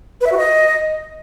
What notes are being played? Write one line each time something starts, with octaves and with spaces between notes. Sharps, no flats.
B4
E5
F#4
D#5